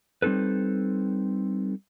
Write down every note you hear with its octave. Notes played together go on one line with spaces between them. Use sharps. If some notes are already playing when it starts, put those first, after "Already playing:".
G3 C4 D#4 A4 B4